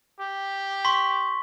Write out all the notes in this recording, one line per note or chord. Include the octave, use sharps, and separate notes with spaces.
G4
C6 C#6 B6